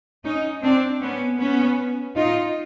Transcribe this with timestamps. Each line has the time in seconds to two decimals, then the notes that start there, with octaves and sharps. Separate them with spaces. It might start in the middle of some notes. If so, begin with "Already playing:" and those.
0.24 C#4 D#4
0.62 C4 D4
1.01 B3 C#4
1.39 B3 C#4
2.16 D#4 F4